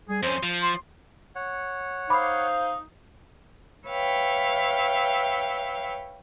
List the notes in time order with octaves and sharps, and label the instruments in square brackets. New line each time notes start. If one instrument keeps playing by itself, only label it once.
[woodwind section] G3 G#4
[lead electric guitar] F2 C#4 [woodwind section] C5
[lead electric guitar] F3
[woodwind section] C6
[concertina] C#5 F#5
[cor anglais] D#4 [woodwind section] C5 F5 [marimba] B5 D6
[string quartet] B4 C#5 E5 F5 G5